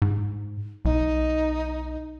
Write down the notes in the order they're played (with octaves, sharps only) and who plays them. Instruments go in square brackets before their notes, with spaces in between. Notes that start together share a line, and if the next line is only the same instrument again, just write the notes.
[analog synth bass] G#2
[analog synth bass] B1 [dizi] D#4